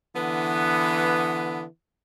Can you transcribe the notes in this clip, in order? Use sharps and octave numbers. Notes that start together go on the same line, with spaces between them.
D3 E3 B3